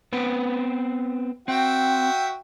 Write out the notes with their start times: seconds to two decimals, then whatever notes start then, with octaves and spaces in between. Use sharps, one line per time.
0.13 B3 C4 B4
1.48 C4 F#4 E5 G5